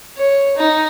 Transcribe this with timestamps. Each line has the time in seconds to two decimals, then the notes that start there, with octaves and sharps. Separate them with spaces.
0.17 C#5
0.57 D#4